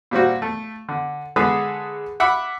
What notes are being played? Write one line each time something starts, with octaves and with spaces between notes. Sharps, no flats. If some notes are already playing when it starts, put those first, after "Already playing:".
A#2 G3 C4 F#4
A3
D3
D3 G#3 G#4 A4 B4 D#6
E5 F#5 B5 D6